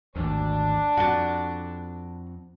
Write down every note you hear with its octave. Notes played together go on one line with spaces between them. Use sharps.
G#1 D2 D4
F2 F#4 A5